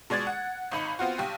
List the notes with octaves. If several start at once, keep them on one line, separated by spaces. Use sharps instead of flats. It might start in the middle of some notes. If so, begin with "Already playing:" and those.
B2 G#3 D5 G#6 A6
F#5
G#1 D#4 B5 C#7
B3 C4 F4 F#4
B1 G4